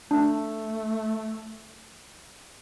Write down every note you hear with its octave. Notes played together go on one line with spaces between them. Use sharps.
A3 D4